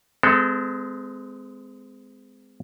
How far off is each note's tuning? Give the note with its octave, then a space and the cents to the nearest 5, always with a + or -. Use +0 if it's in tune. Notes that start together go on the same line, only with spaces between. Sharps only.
G#3 +5 C4 -40 A4 +0